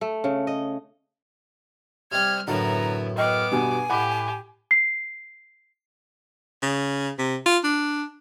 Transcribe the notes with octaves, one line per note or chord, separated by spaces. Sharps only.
A3
C#3
D#5
C3 G3 C4 F6 G#6
F#2 A2 D3 B3 E4 A5 A#5
B3 D#5 G5 D6 F6
G2 B2 G#5
A2 G4 F#5 B5 D6
C7
C#3
C3
F4
D4